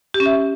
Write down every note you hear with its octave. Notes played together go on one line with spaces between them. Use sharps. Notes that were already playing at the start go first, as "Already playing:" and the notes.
G4
C#4
E5